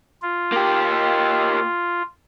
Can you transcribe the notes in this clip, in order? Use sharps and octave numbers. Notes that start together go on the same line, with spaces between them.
F4
A#3 G4